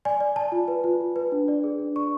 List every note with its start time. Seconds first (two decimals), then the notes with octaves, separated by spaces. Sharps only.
0.05 D5 G#5
0.20 D5
0.36 D5 A5
0.52 F4
0.68 B4
0.84 F4
1.01 F4
1.16 B4
1.32 D4
1.48 D5
1.64 G#4
1.79 D4
1.96 D5 C#6